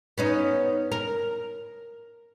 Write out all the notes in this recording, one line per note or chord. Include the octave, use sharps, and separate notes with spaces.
B3 C#4 D#4
A#4